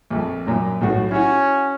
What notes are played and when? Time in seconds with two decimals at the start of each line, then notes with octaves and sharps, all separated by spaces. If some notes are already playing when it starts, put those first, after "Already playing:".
0.10 A#1 F2
0.47 F#2 A#2
0.81 B1 A2 F#4
1.11 C#4 E4 F#4